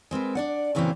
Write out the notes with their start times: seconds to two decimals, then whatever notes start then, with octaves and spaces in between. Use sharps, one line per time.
0.11 G#3 C4 A#4 B4
0.35 D4 D5 F#5
0.75 A#2 C#3 E3 F#3 A#3 C4